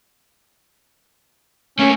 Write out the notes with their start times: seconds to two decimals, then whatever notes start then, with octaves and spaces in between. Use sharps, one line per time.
1.79 A3 A#3 C#4